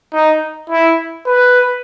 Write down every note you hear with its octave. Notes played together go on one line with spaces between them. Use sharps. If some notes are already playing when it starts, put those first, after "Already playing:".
D#4
E4
B4